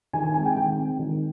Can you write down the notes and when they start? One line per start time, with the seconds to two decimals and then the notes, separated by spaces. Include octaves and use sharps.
0.13 D#3 G#5
0.24 G#5
0.34 G#3 C4 G#5
0.45 G5
0.56 D#3 G5
0.78 G#3 C4
0.99 D#3